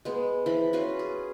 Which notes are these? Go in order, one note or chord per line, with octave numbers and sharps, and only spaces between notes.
G#3 B3
E3 F3 B5
C#4 F4 F#4 B4
G#4